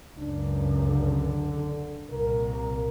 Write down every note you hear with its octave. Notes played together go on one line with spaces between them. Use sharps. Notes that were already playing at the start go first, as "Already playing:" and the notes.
C#2 F#2 D4
D3
C2 A#2 A#4